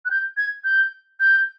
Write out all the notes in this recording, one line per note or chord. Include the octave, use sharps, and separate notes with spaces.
F#6
G6
G#6
G6
G6